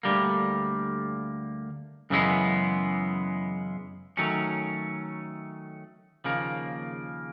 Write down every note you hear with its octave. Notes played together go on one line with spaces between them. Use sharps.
D2 D3 G3 A#3
F#2 C#3 E3 G#3 B3
D#3 F#3 A3 C#4
D#2 C#3 F3 A#3